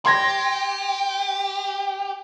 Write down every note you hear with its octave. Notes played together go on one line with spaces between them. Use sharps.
G4 C6 G#6 A#6